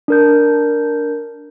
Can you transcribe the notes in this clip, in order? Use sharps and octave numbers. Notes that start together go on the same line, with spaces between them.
D4 A#4 G6